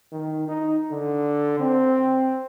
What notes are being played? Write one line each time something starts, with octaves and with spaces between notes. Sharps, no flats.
D#3
D#4
D3
C4